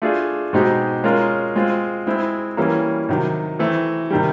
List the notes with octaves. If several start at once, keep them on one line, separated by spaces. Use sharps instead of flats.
A3 D4 F4 G#4
B2 G#3 C4 D#4 G4
G#3 C#4 F4 A#4
G#3 C4 F4
G#3 C4 E4
E3 G3 A#3 C#4
C3 D#3 F#3
E3 A3 C4
C3 D#3 G3